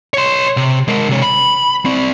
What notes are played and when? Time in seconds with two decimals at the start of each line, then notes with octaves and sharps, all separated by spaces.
0.14 C#5 C6
0.57 C3
0.88 G#3 A#4
1.08 C3 C#5
1.22 B5
1.85 C4 D5